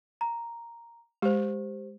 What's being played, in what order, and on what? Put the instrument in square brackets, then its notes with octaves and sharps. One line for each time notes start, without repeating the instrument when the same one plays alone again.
[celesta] A#5
[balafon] G#3 [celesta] G4 C5